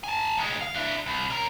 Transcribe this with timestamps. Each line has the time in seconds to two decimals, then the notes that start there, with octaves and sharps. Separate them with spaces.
0.04 G#5 A5
0.37 D2 G#3
0.61 F5
0.74 D4 E4
1.06 C2
1.30 C#4 A#4